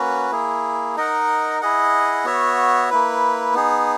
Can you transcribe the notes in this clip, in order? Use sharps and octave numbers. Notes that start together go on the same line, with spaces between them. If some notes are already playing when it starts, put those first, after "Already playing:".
Already playing: A#3 C#4 F#4 B4
A#3 E4 G#4
D#4 A#4 D#5 F#5
E4 G#4 D#5 F#5
B3 F#4 C#5 E5
A#3 E4 B4
B3 D#4 G#4